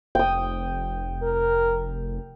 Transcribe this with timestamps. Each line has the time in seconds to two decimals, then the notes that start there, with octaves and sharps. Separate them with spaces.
0.15 F1 G5 D#6
1.22 A#4